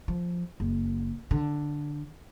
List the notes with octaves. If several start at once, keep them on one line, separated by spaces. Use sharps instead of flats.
F3
F#1
D3